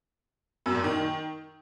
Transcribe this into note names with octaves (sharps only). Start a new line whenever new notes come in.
F#2
A#2
D#3